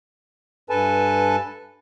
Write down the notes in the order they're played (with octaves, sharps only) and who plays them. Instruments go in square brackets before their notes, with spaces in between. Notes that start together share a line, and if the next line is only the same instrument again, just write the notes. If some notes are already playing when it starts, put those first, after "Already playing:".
[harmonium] G2 A4 B4 G#5 A5